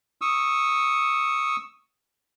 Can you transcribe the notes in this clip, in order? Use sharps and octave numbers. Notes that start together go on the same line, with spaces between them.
C#6 D#6 E6